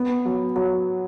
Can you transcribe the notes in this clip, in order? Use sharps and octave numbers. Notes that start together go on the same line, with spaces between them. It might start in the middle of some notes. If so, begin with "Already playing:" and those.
Already playing: B3
F#3
F#3